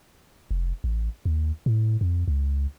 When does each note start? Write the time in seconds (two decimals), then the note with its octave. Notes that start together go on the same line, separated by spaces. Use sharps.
0.51 F1
0.84 A1
1.25 D#2
1.66 A2
2.01 F2
2.28 C#2